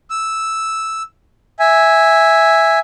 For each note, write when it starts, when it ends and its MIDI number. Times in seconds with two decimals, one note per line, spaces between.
0.10 1.03 88
1.59 2.79 76
1.59 2.79 80